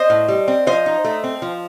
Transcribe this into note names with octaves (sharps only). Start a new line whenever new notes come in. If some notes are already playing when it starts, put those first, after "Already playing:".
Already playing: C5 D#5
A2
G3
C4
F3 C5 D#5
D#4
A3
C4
F3